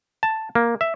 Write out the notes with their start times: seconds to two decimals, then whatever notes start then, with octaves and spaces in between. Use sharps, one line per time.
0.23 A5
0.55 A#3
0.81 E5